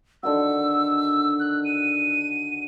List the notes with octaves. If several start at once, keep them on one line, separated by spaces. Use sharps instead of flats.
D3 D#3 F#4 E6
F#6
D#7